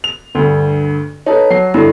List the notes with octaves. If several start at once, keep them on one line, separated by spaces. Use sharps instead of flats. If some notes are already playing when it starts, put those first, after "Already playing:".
F7
D2 G2
D#4 A4 B4 C#5 A5
F#3 C7
G2 D3 E4 A4